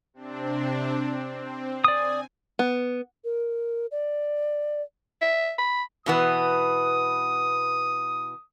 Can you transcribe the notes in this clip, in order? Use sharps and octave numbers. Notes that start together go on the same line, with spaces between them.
C3 C4 D4
C4
D5 G#5 D#6
B3
A#4
D5
E5
B5
B2 E3 B3 D#6